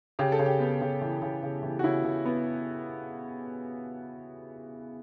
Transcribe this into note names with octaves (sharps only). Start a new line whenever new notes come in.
C#3 G4
A4
C#3
G4
B3
C#3
E3
C#3
C#3
E3
F#4
C#3 E4
C#3
B3